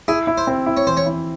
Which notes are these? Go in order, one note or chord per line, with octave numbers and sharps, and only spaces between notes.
E4 G#4
E4
C5
C4
E4
C#5
E3 C5
C#5
E4